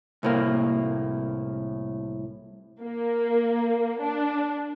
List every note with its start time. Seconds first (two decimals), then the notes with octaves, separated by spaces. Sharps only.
0.23 C2 A2 A#3
2.83 A#3
4.01 D4